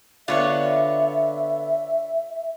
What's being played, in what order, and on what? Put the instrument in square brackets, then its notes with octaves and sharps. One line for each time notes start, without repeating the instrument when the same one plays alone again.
[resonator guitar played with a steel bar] D3 B3 [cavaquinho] F4 C#5 [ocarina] E5